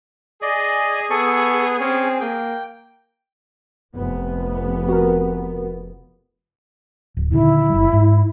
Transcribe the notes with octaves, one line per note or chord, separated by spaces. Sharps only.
G#4 D5 D#5
B3 A4 C#6
C4 C#4 C#5
A#3 G5
F1 B3
F#4 A#4
D1
A#2 D3 D#3 E4
F#1 G3
G#2